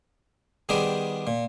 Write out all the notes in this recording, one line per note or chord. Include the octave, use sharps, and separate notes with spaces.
D#3 G3 B3 G4 G#4 C5
A#2